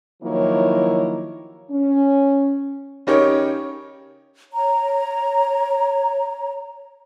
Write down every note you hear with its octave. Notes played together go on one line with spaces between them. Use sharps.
D#3 F3 F#3 A#3 E4 C#5
C#4
C#3 C#4 D#4 G4 A#4 C#5
C#5 A#5